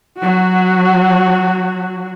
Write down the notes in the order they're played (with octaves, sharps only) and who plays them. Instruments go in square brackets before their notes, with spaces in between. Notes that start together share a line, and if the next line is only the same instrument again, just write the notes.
[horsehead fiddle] F#3 F#4